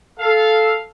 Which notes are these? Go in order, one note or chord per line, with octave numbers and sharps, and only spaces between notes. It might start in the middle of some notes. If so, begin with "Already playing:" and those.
A4 F5